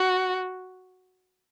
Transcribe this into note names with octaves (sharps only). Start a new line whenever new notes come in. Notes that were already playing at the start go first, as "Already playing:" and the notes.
Already playing: F#4